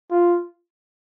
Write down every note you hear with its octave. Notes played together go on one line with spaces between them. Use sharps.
F4